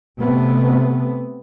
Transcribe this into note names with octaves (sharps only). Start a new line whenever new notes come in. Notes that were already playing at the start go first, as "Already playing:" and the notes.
C3 A3 B3